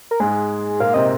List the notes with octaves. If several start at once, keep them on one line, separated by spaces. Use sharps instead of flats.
A#4
G#2 G#3 G#4
A#2 A#3 F5
C3 C4 D#5